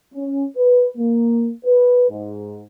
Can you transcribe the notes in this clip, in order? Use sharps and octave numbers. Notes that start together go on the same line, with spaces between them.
C#4
B4
A#3
B4
G#2